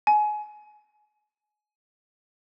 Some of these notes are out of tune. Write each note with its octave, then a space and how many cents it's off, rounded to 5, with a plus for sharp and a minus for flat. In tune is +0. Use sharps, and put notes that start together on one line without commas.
G#5 +25